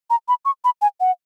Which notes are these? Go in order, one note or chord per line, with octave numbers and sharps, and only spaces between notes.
A#5
B5
C#6
B5
G#5
F#5